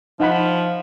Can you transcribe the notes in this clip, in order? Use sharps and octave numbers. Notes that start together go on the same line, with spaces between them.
F3 D#4 F#5 B5